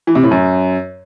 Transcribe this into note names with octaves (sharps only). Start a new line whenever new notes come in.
E3
C3
A2
F#2